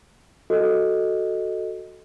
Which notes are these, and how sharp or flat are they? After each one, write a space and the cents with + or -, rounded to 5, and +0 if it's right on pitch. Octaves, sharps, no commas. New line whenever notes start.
F#4 +0 A4 +0 D#5 +0